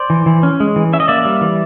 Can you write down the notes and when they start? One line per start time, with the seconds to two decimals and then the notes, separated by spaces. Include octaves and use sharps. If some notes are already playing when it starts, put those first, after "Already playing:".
Already playing: C5 D5
0.10 E3
0.26 E3
0.43 C#4
0.60 G#3
0.76 E3
0.93 C#4 E5
1.00 D#5
1.08 A#3 D5 E5
1.25 G3
1.41 E3